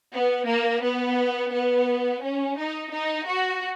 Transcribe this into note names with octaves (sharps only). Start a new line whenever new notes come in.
B3
A#3
B3
B3
C#4
D#4
D#4
F#4